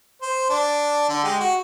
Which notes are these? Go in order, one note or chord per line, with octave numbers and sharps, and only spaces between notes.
C5
D4
D3
G#3 G4
F#4